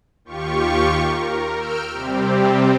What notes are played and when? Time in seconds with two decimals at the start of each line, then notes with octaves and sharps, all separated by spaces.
0.25 D#2 F4 G4 C#6
1.03 A#4
1.55 E6 F6 G6 D7
1.91 C3 G3 C4 G4